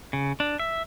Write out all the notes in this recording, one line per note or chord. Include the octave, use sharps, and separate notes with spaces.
C#3
D4
E5